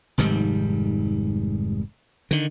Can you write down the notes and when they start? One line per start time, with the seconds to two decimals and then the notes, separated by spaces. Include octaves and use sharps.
0.18 F1 G#2 D#3 G3
2.31 D3 D#3